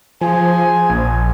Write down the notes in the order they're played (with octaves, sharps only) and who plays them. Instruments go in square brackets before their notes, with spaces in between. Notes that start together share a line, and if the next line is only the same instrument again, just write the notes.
[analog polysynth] F3 [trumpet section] G#4 C5 G#5
[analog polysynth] A#1